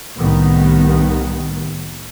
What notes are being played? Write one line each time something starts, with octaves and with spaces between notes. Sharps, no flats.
C2 A2 D#3 B3